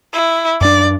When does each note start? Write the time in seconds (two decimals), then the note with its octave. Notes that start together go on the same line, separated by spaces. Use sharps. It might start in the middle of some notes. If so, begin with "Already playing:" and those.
0.13 E4
0.61 F#2 D4 D5